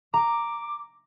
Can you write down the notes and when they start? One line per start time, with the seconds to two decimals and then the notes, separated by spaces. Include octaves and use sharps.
0.14 A#5 D6